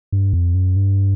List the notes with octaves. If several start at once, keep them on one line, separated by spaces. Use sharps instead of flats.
G2
F2
F#2
G2